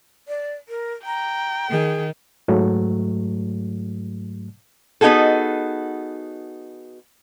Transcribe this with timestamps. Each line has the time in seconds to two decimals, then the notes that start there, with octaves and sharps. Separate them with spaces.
0.28 D5
0.69 A#4
1.06 G5 A#5
1.70 D#3 G#4
2.48 G#2 F#3 A3
5.01 B3 D#4 F#4 G#4 A4